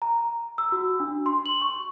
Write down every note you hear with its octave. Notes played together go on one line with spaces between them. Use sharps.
A#5
E6
F#4
D4
C6
F#7
C#6